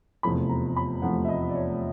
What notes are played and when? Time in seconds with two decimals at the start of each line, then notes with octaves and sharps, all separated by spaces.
0.23 F1 E2 C3 F3 A3 B5
0.49 A#5
0.76 B5
1.02 F1 E2 C3 F3 A3 F#5
1.24 E5
1.28 D#5
1.49 D5
1.55 C#5